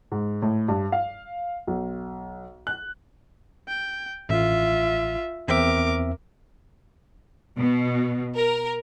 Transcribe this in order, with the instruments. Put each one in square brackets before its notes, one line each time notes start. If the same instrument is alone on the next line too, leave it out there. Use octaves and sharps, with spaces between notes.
[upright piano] G#2
A2
G2
F5
B1
F#6
[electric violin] G5
[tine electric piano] A1 [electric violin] F4 E5
[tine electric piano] E2 C4 E5 [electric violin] A#4 D6
[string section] B2
A#4